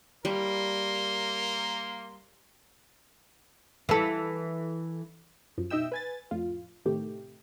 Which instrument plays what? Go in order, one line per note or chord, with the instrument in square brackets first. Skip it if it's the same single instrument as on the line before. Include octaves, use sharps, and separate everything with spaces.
[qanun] G3 [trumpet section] A#3 A#4 C6
[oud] E3 A4
[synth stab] F#2 F3
B2 D#4 D#5 E5 G5 E6
B4 G#5 A6
F2 A2 F4
A2 C3 D#3 A3 G4